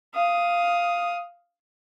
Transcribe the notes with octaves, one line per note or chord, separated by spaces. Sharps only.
F5 D#6